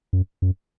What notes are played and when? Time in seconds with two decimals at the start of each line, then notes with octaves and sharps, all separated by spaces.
0.13 F#2
0.42 F#2